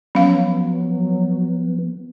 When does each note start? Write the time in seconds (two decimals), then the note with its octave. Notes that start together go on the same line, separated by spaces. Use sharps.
0.15 F3 F#3 B3 C#4 F5